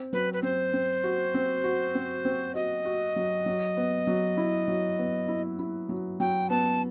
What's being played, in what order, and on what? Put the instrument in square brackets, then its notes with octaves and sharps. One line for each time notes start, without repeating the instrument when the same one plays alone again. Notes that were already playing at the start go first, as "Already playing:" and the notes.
Already playing: [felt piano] C4
[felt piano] F#3 [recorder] B4
[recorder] B4
[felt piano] C4 [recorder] C5
[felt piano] C4
F#4
C4
F#4
C4
C4
[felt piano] F#4 [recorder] D#5
[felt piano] F#4
F#3
F#3
B3
F#3
E4
F#3
B3
E4
E4
F#3
[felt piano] F#3 [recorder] G5
[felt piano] B3 [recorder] A5